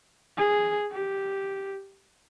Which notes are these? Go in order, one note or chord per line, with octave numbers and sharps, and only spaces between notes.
G#4
G4